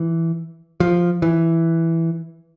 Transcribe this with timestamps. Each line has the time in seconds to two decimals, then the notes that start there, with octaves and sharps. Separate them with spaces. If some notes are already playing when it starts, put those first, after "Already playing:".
Already playing: E3
0.80 F3
1.22 E3